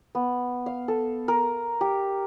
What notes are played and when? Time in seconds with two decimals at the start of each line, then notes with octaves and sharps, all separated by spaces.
0.15 B3
0.66 F5
0.88 A4
1.28 A#4
1.81 G4